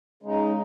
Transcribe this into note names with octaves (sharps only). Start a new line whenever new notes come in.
C#3 G#3 D#4